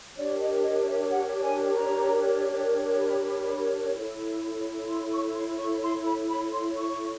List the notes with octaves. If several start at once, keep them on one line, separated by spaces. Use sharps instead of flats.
D4 G4 A#4 C#5 D5
D#5
D#5
E5
F#5
G#5
A#5
B5
E4 A4 C#5
C6
C#6
C6
C#6
C6
B5
B5
C6
C#6